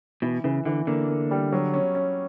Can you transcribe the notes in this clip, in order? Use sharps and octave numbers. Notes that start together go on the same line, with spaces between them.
B2 E3
C#3 E3
D3 E3
D3 A#3
A#3
G3
F#3
C#4
C#4